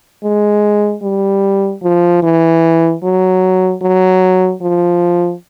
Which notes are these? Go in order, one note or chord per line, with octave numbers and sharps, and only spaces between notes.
G#3
G3
F3
E3
F#3
F#3
F3